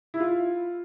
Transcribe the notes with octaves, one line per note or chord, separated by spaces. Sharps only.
E4
F4